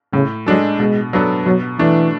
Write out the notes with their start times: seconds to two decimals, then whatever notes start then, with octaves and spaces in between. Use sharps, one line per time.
0.13 A2 C#3
0.46 F#3 G#3 D4 A4
0.79 B2 G#3
1.13 F#3 B3 D4 A4
1.46 B2 F#3
1.79 E3 A3 D4